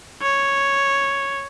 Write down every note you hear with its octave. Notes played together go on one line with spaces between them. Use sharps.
C#5